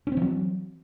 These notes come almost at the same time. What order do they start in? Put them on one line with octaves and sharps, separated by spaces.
C#4 C4 E3 F#3